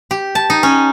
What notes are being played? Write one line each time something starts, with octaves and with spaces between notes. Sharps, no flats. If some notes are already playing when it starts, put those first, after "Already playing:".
G4
A5
D#4
C#4